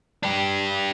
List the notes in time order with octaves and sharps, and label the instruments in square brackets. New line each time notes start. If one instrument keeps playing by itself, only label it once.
[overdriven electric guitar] D4 G4